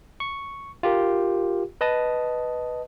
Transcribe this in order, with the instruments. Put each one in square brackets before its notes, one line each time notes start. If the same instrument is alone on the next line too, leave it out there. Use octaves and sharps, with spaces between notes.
[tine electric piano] C#6
F4 G4 A#4
B4 D#5 A5 D#6